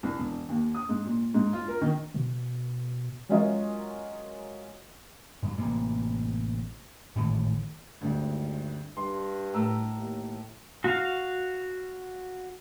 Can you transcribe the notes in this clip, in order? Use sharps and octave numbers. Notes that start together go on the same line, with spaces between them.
C2
E1
D#2
D#6
G#2
A#2
G#2
F4
A#4
D#3
B2
F#3 G#3 C#4 F4 A#4 D#5
G2 F#3
A1 C3 A#3
G#1 A2 D#3 E3
G#1 D2 G2
G2 C6
A2 A#4 A#5 E6
D#2
F#4 F5